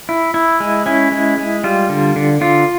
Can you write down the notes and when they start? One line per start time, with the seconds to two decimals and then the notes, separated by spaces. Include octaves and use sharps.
0.09 E4
0.34 E4
0.60 G#3
0.86 C#4 E4
1.12 G#3
1.38 G#3
1.64 G3 F4
1.89 D3
2.16 D3
2.41 D3 F4